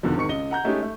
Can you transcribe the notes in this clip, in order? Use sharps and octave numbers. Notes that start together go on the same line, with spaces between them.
E2 B2 D3 D#3 F3
G#1 D#3 C#6 C#7
C#2 D#5 G7
F#5 A#5 G6
G#3 A3 C#4 D#4 G4
A3